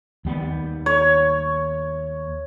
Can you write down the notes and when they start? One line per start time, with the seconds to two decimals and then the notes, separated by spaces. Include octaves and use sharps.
0.25 D#2 G3 B3
0.86 C#5